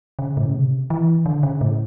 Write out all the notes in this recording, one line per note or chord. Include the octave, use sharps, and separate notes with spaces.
C#3
A2
C#3
C3
E3
D3
C#3
A2